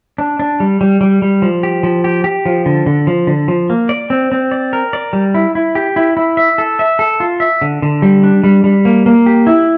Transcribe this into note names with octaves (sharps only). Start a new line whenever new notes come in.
D4
D4
G3
G3
G3
G3
F3
G4
F3
G4
G4
F3
D3
D3
F3
D3
F3
A#3
D5
C4
C4
D5
A#4
D5
G3
E4
E4
G4
E4
E4
E5
A4
E5
A4
F4
E5
D3
D3
G3
D4
G3
G3
A#3
A#3
G4
E4